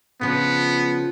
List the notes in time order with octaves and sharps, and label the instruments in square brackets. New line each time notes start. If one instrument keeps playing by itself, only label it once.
[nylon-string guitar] C#3 F3 D4 [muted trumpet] B3